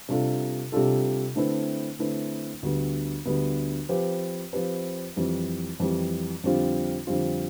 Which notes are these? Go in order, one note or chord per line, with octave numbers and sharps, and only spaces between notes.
C3 G3 D4 F4 A4
C3 G3 D4 F4 A4
D3 A3 C4 E4 B4
D3 A3 C4 E4 B4
D2 D3 G3 B3
D2 D3 G3 B3
F3 C4 G4 B4
F3 C4 G4 B4
F2 E3 G3
F2 E3 G3
F2 D3 G3 C4 F4
F2 D3 G3 C4 F4